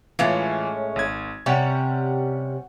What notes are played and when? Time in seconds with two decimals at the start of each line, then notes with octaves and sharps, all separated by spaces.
0.19 A2 E3 G#3 C#4 F4 F5
0.96 G#1 G#6
1.46 C3 G3 C#4 F#5 C#6